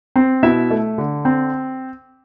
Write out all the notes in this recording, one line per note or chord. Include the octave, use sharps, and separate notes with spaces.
C4
B2 E4 E5
A3
D3
C4